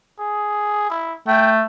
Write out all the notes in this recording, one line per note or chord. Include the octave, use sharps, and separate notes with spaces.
G#4
E4
A3 G5